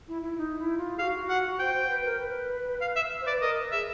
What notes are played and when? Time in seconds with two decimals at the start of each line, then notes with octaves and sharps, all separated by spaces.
0.08 E4
0.22 E4
0.38 D#4
0.59 E4
0.78 F4
0.98 F#4 G#4 F5
1.29 F#5
1.59 C5 G5
1.74 C5
1.89 B4
2.05 A#4
2.20 B4
2.81 F5
2.96 E5
3.21 C5
3.26 B4 D5
3.41 A#4 D#5
3.72 G#4 E5